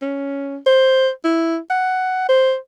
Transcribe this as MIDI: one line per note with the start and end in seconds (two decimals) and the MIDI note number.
0.02 0.57 61
0.66 1.10 72
1.24 1.58 64
1.70 2.26 78
2.29 2.56 72